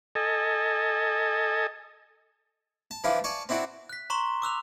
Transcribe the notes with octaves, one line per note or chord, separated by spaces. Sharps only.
A4 D#5 G#5
A5
E3 F3 D4 E4 F4
D5 G#5 A5 C#6
C4 D4 E4 F#4 D5
F#6 B6
A#5 C6 C#6 E7 G7
D6 E6 F#6 F7